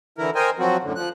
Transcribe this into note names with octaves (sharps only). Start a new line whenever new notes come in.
D3 E3 E4 A#4
A#4 C5 D#5 G5 G#5
F3 F#3 C4 F#4
F#2 A2 D3
F3 F#6